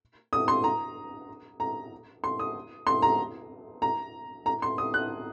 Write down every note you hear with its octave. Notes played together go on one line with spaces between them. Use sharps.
D#6
C6
A#5
A#5
C6
D#6
C6
A#5
A#5
A#5
C6
D#6
F#6